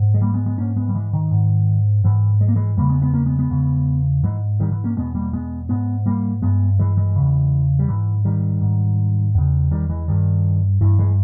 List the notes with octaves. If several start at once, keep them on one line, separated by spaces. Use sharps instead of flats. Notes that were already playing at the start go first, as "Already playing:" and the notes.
Already playing: G#2
G#3
G3 A#3
G#3 B3
G#3 B3
G#2 A#3 C#4
G#3 B3
G3
E3 G#3
D#3
G#2
G#2 E3
G#3
A#3
E3 G#3
E2 C#3 G3 A#3
G#3 B3
G#3 B3
A#3 C#4
G#3 B3
G#3 B3
E2 C#3
G#2 E3 G#3
D#3 G3
E3
A#3 C#4
E2 B2 G#3 B3
G3 A#3
G#3 B3
G#2 G#3 B3
G3 A#3
G2 G#3 B3
E3 G#3
E3 G#3
E2 C#3
G3
G#2 E3
D#3 G3
G#2
E2 C#3
D#3 G3
E3 G#3
G2 D#3 G3
G2 E3
E3 G#3